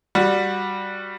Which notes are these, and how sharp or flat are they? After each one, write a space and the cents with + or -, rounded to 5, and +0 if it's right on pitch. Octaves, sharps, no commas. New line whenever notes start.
G3 +0 F#4 -15